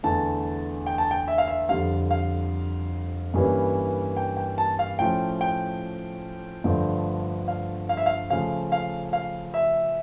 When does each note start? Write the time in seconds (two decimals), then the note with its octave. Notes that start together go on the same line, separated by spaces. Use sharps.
0.03 E2 D3 A3 A5
0.86 G5
0.98 A5
1.11 G5
1.28 E5
1.38 F5
1.48 E5
1.69 F2 D3 G3 F5
2.10 F5
3.34 G2 E3 G3 A#3 C#4
4.17 G5
4.37 G5
4.58 A5
4.79 F5
4.99 A2 F3 A3 C#4 G5
5.41 G5
6.64 G2 D3 F3 A3
7.48 F5
7.89 F5
7.97 E5
8.06 F5
8.30 C#3 F3 A3 F5
8.72 F5
9.13 F5
9.54 E5